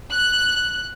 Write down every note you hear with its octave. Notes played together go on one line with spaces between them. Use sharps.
F#6